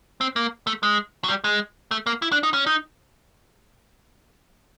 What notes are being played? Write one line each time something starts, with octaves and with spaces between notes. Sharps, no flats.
C4
A#3
A3
G#3
F#3
G3
G#3
A3
A#3
E4
D4
D#4
C#4
D#4